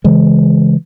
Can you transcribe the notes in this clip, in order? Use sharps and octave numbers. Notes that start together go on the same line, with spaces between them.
C#3 E3 G#3